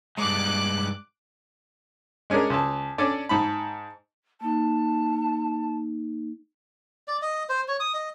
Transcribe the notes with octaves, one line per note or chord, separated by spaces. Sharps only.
G2 G#3 D6 F#6
G#3 C#4 D4 G#4 A#4
C#2 A5
C#4 D4 A4 D5
G#2 A5 B5
A#3 D#4 A5
D5
D#5
C5
C#5
D#6
D#5